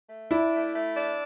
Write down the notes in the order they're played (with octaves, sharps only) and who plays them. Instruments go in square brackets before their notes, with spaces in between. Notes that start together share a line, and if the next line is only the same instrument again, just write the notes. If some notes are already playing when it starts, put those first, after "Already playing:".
[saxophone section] A3
[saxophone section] D4 [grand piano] E4
[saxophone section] A3
A3
D4